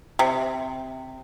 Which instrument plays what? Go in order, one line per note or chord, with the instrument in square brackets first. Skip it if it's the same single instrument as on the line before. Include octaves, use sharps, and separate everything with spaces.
[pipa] C3